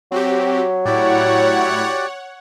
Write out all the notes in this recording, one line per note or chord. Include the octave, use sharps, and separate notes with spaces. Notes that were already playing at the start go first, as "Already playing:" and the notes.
F#3 C4 F#4 G4
A2 E4 F#4 G4 C#5 D5 F#5